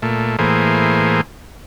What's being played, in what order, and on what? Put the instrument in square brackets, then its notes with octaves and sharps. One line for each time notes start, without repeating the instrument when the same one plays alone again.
[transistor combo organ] A#2 A3
A2 E3 A#3 G#4 C5